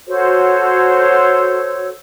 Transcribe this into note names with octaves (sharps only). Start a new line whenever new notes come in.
F#4 A4 C5 C#5